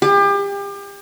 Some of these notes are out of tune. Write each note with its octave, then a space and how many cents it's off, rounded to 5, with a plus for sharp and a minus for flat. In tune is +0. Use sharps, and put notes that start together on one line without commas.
G4 +35